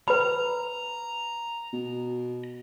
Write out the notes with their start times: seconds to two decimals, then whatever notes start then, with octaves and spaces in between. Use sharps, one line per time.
0.08 B4 A#5 B5
1.73 B2